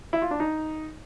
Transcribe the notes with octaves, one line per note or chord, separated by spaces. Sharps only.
E4
F4
D4
D#4